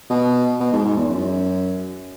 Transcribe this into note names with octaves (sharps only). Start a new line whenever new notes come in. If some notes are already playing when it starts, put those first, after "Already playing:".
B2
B2
G#2
G#2
E2
F#2